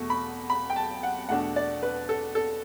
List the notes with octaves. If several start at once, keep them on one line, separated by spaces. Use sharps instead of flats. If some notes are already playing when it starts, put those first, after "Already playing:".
Already playing: E2 B2 A3 C#6
B5
B5
G5
A5
F#5
E2 B2 A3 D4 F#5
D5
B4
A4
A4